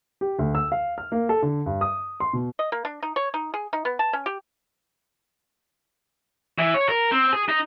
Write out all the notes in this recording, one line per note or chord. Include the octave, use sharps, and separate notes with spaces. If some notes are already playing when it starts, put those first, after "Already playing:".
G4
D2
E6
F5
F6
A#3
A4
D3
G2
D#6
C6
B2
D#5
A#3
D4
D#4
C#5
D#4
G#4
D#4
B3
A5
C#4
G4
E3
C#5
A#4
C4
G#4
D#4